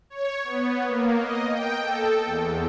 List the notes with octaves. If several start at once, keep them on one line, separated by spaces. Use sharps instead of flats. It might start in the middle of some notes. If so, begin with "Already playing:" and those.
C#5
B3
A#3
D#5
G5
A4
E2